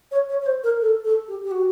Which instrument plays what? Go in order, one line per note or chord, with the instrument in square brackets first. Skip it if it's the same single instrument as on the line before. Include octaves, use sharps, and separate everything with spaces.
[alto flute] C#5
C#5
C#5
C5
A#4
A4
A4
G4
G4
F#4